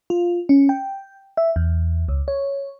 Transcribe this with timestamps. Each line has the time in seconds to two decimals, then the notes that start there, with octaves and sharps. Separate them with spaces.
0.10 F4
0.49 C#4
0.69 G5
1.37 E5
1.56 E2
2.09 C#2
2.28 C#5